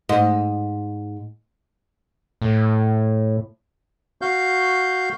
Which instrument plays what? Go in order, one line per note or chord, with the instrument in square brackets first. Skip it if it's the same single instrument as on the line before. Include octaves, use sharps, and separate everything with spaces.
[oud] G#2 D#5
[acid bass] A2
[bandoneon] F#4 F5 G6